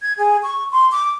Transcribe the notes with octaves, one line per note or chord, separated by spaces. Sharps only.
G#6
G#4
C#6
C6
D6